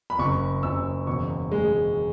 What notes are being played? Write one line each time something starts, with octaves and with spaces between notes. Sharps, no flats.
B5
F#1 C#6
F#1 E6
E1 C#6
G#3